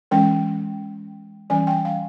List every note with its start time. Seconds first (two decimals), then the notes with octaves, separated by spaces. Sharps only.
0.11 E3 G#3 C#4 G5
1.50 E3 G3 C#4 G#5
1.67 G5
1.85 F5